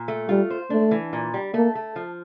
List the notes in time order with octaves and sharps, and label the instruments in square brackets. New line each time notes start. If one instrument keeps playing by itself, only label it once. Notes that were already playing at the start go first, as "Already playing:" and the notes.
Already playing: [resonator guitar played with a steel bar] A#2
A3
[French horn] G3 [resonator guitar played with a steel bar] F4
[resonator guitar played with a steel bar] C5
[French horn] A3 [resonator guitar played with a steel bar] D4
[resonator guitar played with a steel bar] E3
A#2
G3
[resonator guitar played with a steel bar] A3 [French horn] A#3
[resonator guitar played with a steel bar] A3
F3